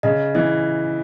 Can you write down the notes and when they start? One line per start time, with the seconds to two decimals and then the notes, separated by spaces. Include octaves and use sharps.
0.03 C#3 D#5
0.35 E3 D#5